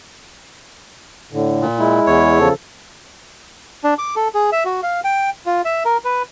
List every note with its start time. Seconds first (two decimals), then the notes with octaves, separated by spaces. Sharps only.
1.32 A2 D3
1.62 A#2
1.79 G#3 E4
2.07 E2 C#5
2.39 C#3 F3 A4
3.84 D4
3.98 D6
4.16 A4
4.34 G#4
4.52 E5
4.65 F#4
4.83 F5
5.05 G5
5.46 F4
5.65 E5
5.85 A#4
6.04 B4